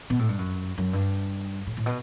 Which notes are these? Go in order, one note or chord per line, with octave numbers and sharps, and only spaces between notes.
B2
A2
G2
F#2
F#2
G2
A2
A2
B2